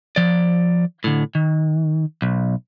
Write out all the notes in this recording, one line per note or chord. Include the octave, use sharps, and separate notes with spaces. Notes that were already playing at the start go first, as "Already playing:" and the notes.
F3 D5
A2 D3
D#3
B1